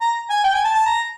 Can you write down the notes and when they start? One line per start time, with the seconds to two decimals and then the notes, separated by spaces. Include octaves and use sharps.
0.01 A#5
0.30 G#5
0.44 G5
0.54 G#5
0.64 A5
0.75 A5
0.86 A#5